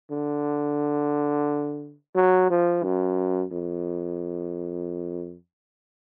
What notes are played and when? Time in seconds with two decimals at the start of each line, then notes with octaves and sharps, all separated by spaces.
0.11 D3
2.15 F#3
2.50 F3
2.83 F#2
3.52 F2